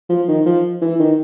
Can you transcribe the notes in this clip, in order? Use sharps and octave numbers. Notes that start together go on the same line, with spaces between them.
F3
D#3
F3
E3
D#3